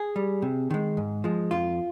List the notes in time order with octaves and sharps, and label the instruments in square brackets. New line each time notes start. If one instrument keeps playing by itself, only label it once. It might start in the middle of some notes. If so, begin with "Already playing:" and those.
Already playing: [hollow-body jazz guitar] G#4
G3
C3
D#3 G#3
G#2
F3 G#3
F2 F4